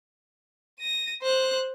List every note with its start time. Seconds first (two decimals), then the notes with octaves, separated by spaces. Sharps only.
0.79 A#6 D#7
1.22 C5 F#6